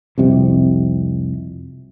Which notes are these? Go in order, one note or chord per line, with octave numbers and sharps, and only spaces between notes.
C2 F2 C3